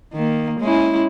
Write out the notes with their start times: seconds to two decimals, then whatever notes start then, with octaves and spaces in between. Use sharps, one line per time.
0.14 D#3 A#3
0.60 G#3 C#4 E4